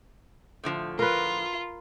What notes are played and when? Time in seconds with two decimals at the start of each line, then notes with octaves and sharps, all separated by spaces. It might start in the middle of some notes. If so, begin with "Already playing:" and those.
0.64 A2 D3 F3
0.99 F4 A#4 B4